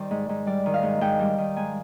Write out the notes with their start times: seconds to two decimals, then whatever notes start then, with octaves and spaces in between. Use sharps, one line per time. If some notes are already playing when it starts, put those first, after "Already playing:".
Already playing: D#3 G3 C5 D5
0.11 G#2
0.29 G#2
0.47 G3 D5
0.66 D#3
0.74 F5
0.83 G#2
1.01 G#2 G5
1.19 G3
1.38 D#3
1.56 G#2 G#5